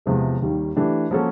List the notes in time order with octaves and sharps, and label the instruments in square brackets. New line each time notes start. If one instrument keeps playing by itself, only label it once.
[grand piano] E2 C3 F3 G#3
D#2 D#3 G3 A#3
E3 A3 D4 G4
F3 A#3 C#4 F#4 A4